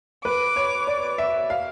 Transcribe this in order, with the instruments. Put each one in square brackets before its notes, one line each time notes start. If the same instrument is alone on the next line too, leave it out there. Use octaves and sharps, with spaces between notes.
[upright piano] B4 [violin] D6
[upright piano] C#5
D5
E5
F5